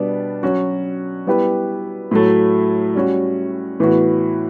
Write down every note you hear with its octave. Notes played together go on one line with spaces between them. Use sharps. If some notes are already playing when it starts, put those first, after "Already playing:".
Already playing: B2 G3 B3 D4
F#3 C#4 F#4
G3 B3 E4 G4 B4
A2 F#3 A3
G3 C#4 F#4
A2 E3 B3 F#4